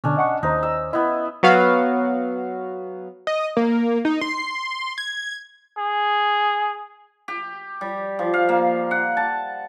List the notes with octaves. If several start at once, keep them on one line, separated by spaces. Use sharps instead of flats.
B2 D3 C#4 D4
D#5 F#5 C#6
D#2 D#4 C5 A#5
E6
B3 E4 D#5
F#3 B3 F#4 F5
D#5
A#3
D#4
C6
G#6
G#4
G4
G3
F3
F5
A#3
F#5
A5